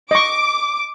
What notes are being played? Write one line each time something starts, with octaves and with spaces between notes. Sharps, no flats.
D#5 C#6 D6